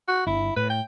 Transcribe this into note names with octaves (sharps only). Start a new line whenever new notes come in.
F#4
G1 E4
A2 B4
G5